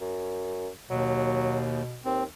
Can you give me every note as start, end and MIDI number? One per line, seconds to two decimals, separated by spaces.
0.01 0.70 42
0.90 1.83 39
0.90 2.01 47
0.90 1.60 54
2.05 2.24 39
2.05 2.24 60